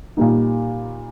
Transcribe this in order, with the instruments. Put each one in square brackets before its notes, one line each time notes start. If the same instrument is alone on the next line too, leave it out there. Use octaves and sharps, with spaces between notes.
[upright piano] A#2 G3 A#3 D#4